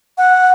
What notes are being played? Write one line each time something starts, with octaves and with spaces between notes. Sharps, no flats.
F#5